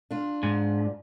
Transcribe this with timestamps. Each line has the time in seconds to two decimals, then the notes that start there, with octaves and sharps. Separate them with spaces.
0.10 D4 F4
0.43 G#2